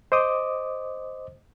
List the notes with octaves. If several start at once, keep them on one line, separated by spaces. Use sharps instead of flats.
C5 D#5 D6 D#6